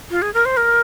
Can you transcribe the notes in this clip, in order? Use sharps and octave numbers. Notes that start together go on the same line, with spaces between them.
F4
G#4
A#4
C5
A#4